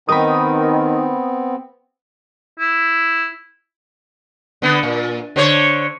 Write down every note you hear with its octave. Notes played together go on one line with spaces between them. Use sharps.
D#3 B3 C4 D#4 A#4 B5 D#6
E4
D3 B3
A#2
D3 C5 C#5